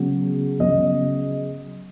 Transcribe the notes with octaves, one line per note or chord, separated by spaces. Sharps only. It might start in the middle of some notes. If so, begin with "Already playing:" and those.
Already playing: C#3 F#3 B3
C#3 F#3 B3 D#5